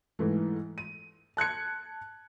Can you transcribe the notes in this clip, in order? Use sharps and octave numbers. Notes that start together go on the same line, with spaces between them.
G#2 E3 A3
D#7
A5 F#6 G#6 C#7